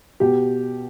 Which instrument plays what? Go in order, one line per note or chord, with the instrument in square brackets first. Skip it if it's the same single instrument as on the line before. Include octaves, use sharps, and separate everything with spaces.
[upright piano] B2 G4